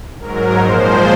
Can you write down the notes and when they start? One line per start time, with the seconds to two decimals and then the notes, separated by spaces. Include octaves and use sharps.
0.19 G#2 F#3 A#4
0.57 A#2 F3 G#3 C5